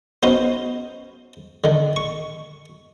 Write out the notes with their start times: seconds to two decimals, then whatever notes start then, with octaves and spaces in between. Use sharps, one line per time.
0.23 B3 C#4 D#4 F#4 C5
1.64 D3 D#3
1.96 C#6